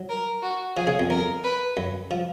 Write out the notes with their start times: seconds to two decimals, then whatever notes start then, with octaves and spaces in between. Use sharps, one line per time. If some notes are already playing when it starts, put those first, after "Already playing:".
Already playing: F#3
0.09 A#4
0.43 F#4
0.77 F3 G#4
0.87 C#3
0.99 F2
1.10 F2 A#4
1.44 B4
1.77 F#2
2.11 F3